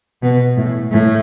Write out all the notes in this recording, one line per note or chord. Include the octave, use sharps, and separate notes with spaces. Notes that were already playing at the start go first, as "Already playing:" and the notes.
B2
A2
A2